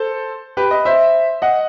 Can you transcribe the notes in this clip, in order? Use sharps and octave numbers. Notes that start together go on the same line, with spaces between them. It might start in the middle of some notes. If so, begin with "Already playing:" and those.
Already playing: A4 C5
G4 B4
B4 D#5
C5 E5
D#5 F#5